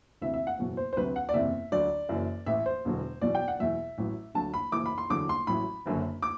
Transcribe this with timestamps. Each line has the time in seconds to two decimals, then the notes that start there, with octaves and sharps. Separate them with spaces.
0.21 D2 C3 E3 E5
0.34 E5
0.47 F#5
0.58 F#1 E2 B2 F#3
0.77 C5
0.93 C5
0.97 D2 C3 F#3 B4
1.16 F#5
1.29 D5
1.34 F#1 E2 C3 E5
1.72 D2 D3 F#3 D5
2.09 F#1 F#2 E3
2.46 A1 A2 E3 E5
2.66 C5
2.85 E1 E2 D3 F#3
3.22 E2 B2 F#3 D5
3.35 G5
3.48 F#5
3.59 E2 B2 F#3 E5
3.98 A1 A2 F#3
4.35 D2 D3 F#3 A5
4.54 B5
4.72 F#1 F#2 E3 D6
4.86 B5
4.98 C6
5.10 E2 D3 F#3 D6
5.29 C6
5.47 A1 A2 F#3 B5
5.86 F#1 F#2 D3 F#3
6.22 D6